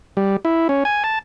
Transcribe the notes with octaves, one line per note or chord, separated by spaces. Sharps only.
G3
E4
C#4
G#5
A5